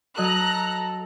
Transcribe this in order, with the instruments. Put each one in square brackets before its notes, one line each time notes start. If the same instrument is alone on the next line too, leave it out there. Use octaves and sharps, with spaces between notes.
[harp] F#3 D#5 [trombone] A4 [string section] A#5 F#6